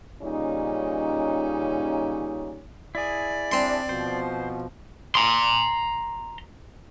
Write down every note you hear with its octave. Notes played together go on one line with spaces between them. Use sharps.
A#2 C#3 G3 C#4 D#4
E4 G#4 D5
C4 D4 C6
B2 F3 C5
A#5 C6